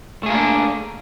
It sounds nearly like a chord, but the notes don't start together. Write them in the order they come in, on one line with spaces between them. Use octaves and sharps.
A3 G#4 A#3 F4 D4